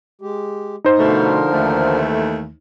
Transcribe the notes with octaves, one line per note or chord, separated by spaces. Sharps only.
G#3 G4
D#4 C5
B2 D3 F3 A3 A#4
D#2 E3 A3